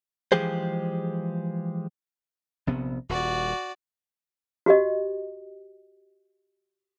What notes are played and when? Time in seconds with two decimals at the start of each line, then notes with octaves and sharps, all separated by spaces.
0.32 E3 F3 G#3 G4 G#4 C5
2.67 A#1 C3 B3
3.09 D#1 F#4 D5
4.66 F#4 G4 D#5